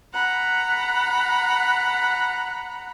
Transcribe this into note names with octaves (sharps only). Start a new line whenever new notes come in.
F#5 A#5 B5